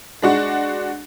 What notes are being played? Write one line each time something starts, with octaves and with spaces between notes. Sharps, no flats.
G#3 D4 F#4